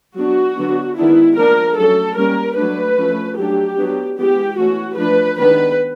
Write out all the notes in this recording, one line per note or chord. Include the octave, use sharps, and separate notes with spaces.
F#3 B3 D4 F#4
D3 F#3 B3 D4
D#3 G#3 B3 D4 E4
F3 A#3 D4 A#4
F#3 A3 C#4 A4
G3 A#3 C#4 A#4
F#3 A3 D4 B4
F3 A3 C#4
F#3 A3 D4 G4
F#3 B3 D4
E3 G#3 B3 G4
E3 A3 C#4 F#4
F3 A3 D4 B4
D#3 G#3 B3 D4 B4